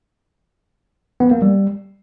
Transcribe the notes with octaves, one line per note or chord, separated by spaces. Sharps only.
B3
A#3
G3